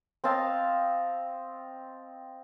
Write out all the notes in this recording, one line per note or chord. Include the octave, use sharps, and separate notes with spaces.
C4 D#5 F5 A5